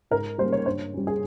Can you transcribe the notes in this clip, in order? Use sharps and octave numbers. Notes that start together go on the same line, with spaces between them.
G#2 A#4
G3 A#3 C#4 C5
C#5
G2 C5
G3 C#4
G#4